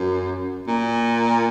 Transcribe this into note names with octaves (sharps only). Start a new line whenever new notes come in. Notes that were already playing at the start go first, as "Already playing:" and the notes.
Already playing: F#2
A#2